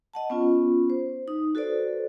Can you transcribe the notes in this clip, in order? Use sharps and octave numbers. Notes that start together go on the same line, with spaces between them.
D#5 F#5 A5
B3 C#4 F4
C5
D#4 D#6
F#4 A4 B4 C5 D5